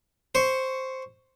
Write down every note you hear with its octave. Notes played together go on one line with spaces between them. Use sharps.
C5 C#6